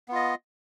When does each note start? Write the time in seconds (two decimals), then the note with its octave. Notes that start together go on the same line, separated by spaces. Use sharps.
0.08 B3
0.12 F4
0.15 D#5